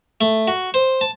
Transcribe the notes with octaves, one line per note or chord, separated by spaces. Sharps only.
A3
F#4
C5
A5